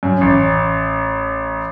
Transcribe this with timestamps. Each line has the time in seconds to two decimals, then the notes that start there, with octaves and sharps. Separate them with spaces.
0.03 F#2
0.21 A1